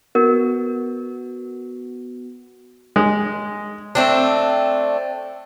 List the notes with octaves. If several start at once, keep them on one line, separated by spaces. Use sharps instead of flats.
B3 F#4 A#4
G#3
A3 C4 D4